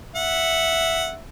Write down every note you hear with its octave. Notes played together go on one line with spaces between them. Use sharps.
E5 F#5